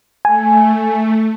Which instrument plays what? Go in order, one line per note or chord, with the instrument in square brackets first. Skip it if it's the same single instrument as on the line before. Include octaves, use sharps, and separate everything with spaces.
[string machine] A3 [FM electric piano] G#5